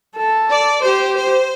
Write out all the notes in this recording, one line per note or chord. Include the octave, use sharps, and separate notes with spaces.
A4
D5
G4 C5
C5